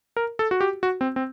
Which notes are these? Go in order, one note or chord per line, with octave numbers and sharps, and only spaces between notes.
A#4
A4
F#4
G4
F#4
C4
C4